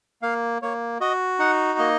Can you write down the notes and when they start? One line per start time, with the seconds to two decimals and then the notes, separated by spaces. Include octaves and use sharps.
0.22 A#3 F5
0.62 A#3 C#5
1.01 F#4 D#5
1.39 D#4 F#5
1.79 A#3 D#5